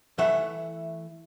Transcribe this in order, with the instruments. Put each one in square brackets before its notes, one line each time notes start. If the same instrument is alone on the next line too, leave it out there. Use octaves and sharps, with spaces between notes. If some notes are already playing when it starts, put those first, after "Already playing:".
[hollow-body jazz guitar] E3 A3 E5 F#5